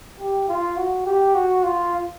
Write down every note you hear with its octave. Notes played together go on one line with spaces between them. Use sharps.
G4
F4
F#4
G4
F#4
F4